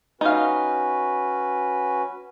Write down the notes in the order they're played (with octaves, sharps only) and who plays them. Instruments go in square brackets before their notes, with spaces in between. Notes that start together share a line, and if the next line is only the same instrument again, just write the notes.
[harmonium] C#4 F#4 B4 [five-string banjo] D#4 F5